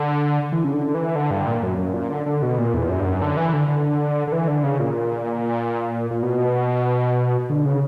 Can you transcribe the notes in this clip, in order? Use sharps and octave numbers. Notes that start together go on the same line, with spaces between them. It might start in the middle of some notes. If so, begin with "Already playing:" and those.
Already playing: D3
E3
C#3
D3
E3
D3
G2
A#2
F#2
F#2
A#2
D3
D3
B2
A#2
E2
F#2
G2
F#2
D3
E3
D3
D3
D3
E3
D3
C#3
A#2
A#2
B2
D3
C#3